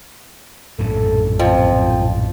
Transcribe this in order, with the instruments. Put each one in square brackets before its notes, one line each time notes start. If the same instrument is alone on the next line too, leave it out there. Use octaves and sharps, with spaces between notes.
[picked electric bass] A#1 F#2 A2 [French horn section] A4
[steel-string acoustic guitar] F2 F3 [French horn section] C4 C5